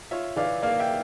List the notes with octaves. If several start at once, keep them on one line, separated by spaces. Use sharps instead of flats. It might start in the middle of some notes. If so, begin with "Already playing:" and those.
F4 C#5 E5
E3 D5 F5
A#3 D5 F5
E5 G5